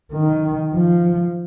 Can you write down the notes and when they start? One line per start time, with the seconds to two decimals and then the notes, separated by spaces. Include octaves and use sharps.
0.12 D#3
0.74 F3